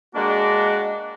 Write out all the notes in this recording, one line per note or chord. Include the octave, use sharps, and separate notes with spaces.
G#3 A#3 D4 F#4